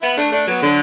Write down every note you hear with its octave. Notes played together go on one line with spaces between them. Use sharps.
B3 E4
A3 D4
A3 D4
F#3 B3
D3 F#3